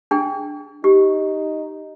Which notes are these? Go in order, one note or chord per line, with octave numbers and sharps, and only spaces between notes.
D4 G#4 G5
D#4 G4